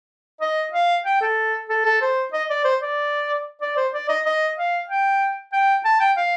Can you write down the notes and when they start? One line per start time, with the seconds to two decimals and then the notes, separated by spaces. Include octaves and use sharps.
0.41 D#5
0.73 F5
1.05 G5
1.21 A4
1.69 A4
1.85 A4
2.01 C5
2.33 D#5
2.50 D5
2.65 C5
2.81 D5
3.62 D5
3.77 C5
3.94 D5
4.09 D#5
4.26 D#5
4.57 F5
4.89 G5
5.53 G5
5.85 A5
6.00 G5
6.17 F5